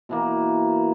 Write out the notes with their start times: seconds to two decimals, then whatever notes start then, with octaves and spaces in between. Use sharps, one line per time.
0.09 B2 E3 A#3